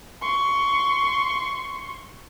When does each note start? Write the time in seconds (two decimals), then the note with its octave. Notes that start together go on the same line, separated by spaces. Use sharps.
0.21 C6 C#6